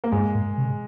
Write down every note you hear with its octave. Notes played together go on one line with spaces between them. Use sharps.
A#3
G2 G#3
G#2
C3